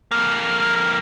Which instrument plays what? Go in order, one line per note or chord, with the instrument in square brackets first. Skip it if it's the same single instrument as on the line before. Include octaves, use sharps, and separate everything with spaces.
[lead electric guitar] F2 A#3 [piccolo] F6